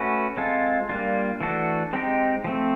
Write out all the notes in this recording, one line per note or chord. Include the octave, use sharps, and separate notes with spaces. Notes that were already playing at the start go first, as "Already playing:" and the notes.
Already playing: A3 C#4 F#4 B4
G#3 C4 F4 A4
G3 A#3 D4 F4
E3 A3 D4 F#4 A4
G#3 C4 D#4 G4
F3 A3 C4